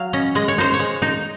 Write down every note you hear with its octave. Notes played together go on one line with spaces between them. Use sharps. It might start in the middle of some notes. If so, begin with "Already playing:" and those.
Already playing: F#3 F5
C#4 D#5
G#3 D#5
C#5
D#4 C5
C#5
G#3
D#4